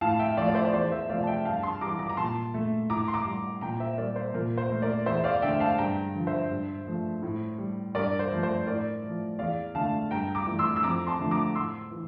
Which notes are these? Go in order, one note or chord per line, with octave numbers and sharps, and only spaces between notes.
A2 F5 A5
E5 G5
F3 A3 D5 F5
D5
C5 E5
D5
E2 C5
C5 E5
C3 F3 A3 D5 F5
A5
E5 G5
G2 F5 A5
A5 C6
E3 G3 A#5 D6
A#5 D6
A#5
A#2 A5 C6
A3
A2 A#5 D6
C6
A#5 D6
G3
A#2 G5 A#5
C5 E5
G3 A#4 D5
C5
A#2 A#4
C5
A3
A#4 D5
E2 C5 E5
D5 F5
D3 A3 E5 G5
F5 A5
G2 G5 A#5
D3 F3
C5 E5
G2
F3 A3
A2
G3
G2 A#4 D5
C5
F3 A3
C5
A2 A#4 D5
F3 A3
E2 D5 F5
D3 A3 F5 A5
G2 G5 A#5
A#5 D6
E3 A3
C6 E6
E6
F2 A#5 D6
A5 C6
D3 F3 A3
A#5 D6
A2 C6 E6
E3